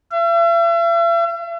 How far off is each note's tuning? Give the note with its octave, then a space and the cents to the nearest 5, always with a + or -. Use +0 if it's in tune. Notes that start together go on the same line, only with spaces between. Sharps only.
E5 +45